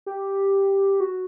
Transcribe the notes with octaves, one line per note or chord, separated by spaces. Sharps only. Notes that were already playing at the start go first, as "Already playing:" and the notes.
G4
F#4